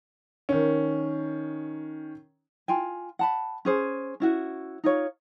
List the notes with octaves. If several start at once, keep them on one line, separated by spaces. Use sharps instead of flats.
D#3 C#4
F4 G5 G#5
F#5 A5 B5
C#4 G#4 C5
C#4 E4 F#4
D#4 F4 C#5